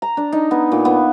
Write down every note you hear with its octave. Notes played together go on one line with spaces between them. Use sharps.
A#5
D4
D#4
B3
A#2
B3